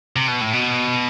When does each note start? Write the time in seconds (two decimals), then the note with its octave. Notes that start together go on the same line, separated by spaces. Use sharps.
0.16 C3
0.28 B2
0.41 A2
0.53 B2